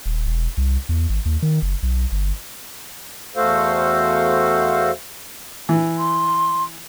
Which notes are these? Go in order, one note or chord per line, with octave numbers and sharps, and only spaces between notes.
D#1
E1
C2
E2
G#1
D#2
D#3
F#1
B1
G1
E2 A3 F#4 A4 C5 F5
E3
C6